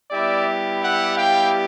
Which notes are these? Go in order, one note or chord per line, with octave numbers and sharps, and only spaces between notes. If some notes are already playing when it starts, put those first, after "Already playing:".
G3 B3 E4 G4 D5 E5
E5 F#5
F5 G5